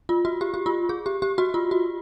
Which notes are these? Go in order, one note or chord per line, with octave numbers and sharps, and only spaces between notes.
F4
F#4
G4
G4
F4
G#4
G4
G4
F#4
F4
F#4